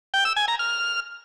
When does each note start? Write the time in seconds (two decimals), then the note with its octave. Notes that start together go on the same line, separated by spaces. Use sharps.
0.14 G5
0.25 E6
0.36 G#5
0.48 A#5
0.59 F6